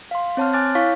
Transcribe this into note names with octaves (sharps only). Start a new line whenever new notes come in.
F5 C6
C4 C#5 A5 C6 F6
G#5 D6 F6 F#6 A6
E4 C#5 F5 C#6 B6